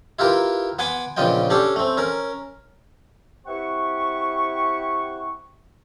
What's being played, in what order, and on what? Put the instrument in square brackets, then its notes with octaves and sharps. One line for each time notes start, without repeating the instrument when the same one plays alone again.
[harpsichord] E4 F4 G4 A#4 B4
B3 F#5 G#5 B5 C6 D6
A#1 C#3 B3 F4 D#5 G5
C#4 D4 G4 A4
A3 C4
C#4 A#4
[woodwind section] C4 E4 G4 F#5 C#6